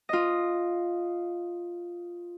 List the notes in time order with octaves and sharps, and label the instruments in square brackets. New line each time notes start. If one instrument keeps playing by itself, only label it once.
[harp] F4 D#5